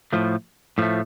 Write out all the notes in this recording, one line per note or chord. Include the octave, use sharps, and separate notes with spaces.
A2 F3 A3
A2 F3 A3